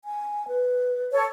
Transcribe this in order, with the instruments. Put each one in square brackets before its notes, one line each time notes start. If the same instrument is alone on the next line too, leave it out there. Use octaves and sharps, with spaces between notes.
[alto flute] G#5
B4
[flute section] A4 C#5